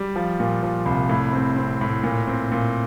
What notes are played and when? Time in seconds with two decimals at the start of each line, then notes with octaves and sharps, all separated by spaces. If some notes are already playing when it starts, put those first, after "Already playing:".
Already playing: G3
0.16 F3
0.40 A#2
0.63 F3
0.86 C2
1.09 A2
1.33 C4
1.56 C4
1.81 A2
2.04 A#2
2.27 C4
2.52 A#2